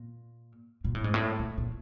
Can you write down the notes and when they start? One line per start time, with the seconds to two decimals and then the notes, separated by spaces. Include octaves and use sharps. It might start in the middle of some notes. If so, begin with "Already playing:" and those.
Already playing: A#2
0.84 A#2
0.95 A2
1.04 G#2
1.14 A2
1.39 A#2
1.58 A#2